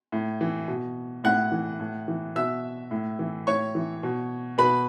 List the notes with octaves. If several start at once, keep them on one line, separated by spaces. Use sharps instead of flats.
A2
E3
B2
A2 F#5 F#6
E3
A2
E3
B2 E5 E6
A2
E3
A2 C#5 C#6
E3
B2
B2 B4 B5